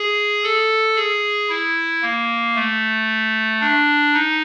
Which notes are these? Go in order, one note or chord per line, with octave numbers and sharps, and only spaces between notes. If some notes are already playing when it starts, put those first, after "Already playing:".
Already playing: G#4
A4
G#4
E4
A#3
A3
D4
D#4